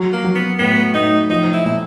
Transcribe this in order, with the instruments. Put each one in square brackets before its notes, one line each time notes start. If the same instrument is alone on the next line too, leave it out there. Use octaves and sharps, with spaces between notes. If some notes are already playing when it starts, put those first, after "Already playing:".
Already playing: [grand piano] F#3
[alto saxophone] A#3
[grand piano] F#3
[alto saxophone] B3
[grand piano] A2 [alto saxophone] B3
[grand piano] A2 [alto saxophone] D#4
[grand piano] F3 [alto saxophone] D#4
[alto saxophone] E4
[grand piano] A#2 [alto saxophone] E4